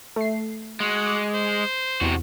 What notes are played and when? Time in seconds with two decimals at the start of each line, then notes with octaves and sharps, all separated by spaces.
0.16 A3 C7
0.80 G#3 F#4
1.06 D6
1.35 C5
2.01 E2 C3 F#4